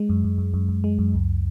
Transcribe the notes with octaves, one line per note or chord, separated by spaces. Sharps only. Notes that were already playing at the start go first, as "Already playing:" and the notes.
Already playing: G#3
F#2
F#2
F#2
F#2
F#2
G#3
F#2
C#2